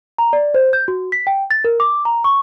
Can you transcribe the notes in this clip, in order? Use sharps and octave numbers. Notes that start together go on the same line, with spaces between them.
A#5
D5
C5
G6
F#4
B6
G5
A6
A#4
D6
A#5
C#6